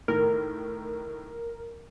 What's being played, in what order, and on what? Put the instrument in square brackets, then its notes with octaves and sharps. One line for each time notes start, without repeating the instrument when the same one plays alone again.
[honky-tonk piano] A2 D#3 [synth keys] A#4